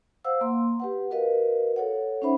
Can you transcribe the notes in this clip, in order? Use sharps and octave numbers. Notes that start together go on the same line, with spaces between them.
C5 F5 F#5 E6
A#3 C6
G4 B4 F#5
F#4 A#4 B4 D#5 F5
A4 C#5 F#5
C#4 D#4 C5 E5 B5